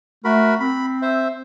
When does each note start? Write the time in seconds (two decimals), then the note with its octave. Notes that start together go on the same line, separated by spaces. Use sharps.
0.24 A3 F#4 A#4 B5
0.60 C4 B5
1.02 C5 E5